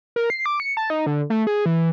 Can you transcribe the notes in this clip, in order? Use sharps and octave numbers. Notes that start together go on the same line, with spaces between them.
A#4
C7
D6
C#7
A5
D#4
D3
A3
G#4
E3